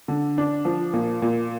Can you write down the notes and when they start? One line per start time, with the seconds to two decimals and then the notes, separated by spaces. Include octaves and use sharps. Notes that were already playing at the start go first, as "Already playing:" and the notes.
0.08 D3
0.38 D4
0.65 F3
0.93 A#2
1.22 A#2